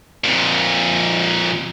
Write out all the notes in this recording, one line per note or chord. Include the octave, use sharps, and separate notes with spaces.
F2 A#2